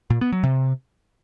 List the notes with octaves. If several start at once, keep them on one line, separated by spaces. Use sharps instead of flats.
A#2
B3
F#3
C3